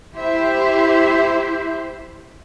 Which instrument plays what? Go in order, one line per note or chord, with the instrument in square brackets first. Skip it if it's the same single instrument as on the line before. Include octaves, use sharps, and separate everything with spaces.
[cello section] E4 G4 C5 E5